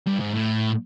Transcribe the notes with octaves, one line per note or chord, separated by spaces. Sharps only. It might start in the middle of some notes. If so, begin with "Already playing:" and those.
G2
G#2
A2